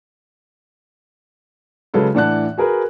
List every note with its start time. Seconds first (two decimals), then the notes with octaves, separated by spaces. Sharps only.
1.94 C#3 F#3 G#3 A4 B4
2.15 A2 E3 D4 F#5 A5 F#6
2.57 F#4 G#4 A#4 B4